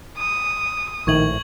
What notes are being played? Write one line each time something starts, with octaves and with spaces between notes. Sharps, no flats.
D#6
A#1 A2 D#3 C#6 G#6 F#7